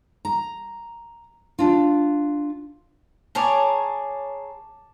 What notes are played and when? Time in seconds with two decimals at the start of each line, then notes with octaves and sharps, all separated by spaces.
0.25 A#5
1.59 D4 F4
3.35 G#4 A#4 C#5 A5 D6